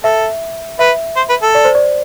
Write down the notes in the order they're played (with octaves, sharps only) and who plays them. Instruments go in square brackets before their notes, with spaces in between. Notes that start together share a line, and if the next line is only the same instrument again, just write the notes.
[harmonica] A4 [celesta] E5
[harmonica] B4 [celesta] E5
[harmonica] C5
B4
A4
[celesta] D5
C5
D5